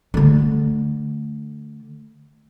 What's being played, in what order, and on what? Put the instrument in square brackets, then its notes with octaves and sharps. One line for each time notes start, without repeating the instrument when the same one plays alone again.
[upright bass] D3 A3